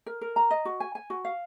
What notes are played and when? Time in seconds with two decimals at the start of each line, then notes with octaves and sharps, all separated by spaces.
0.06 A#4
0.21 A#4
0.36 A#5
0.51 D#5
0.65 F#4
0.80 G#5
0.95 G#5
1.10 F#4
1.25 F5